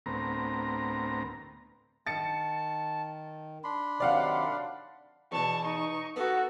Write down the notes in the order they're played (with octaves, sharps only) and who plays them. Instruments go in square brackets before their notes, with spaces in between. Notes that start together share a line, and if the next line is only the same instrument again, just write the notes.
[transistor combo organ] D2 A2 B3 C4 A#4 A#5
[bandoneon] D#3 [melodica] A5 [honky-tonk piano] A6 C#7
[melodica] D4 B5 C6
[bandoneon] C3 D#3 F#3 [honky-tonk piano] D5 F5 F#5
[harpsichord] E2 B2 [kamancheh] A5 C#6
[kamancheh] D#4 C#6
[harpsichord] B3 [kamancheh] F#4 A4